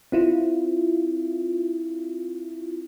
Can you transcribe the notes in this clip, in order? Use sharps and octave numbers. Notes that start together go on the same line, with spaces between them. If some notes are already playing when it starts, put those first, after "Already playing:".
C4 E4 F4